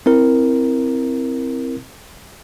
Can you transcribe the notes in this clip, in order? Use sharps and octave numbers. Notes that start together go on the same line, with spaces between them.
C4 E4 A#4